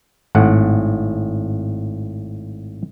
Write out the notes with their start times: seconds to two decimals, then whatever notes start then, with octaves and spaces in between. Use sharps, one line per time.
0.35 G#1 A2 F#5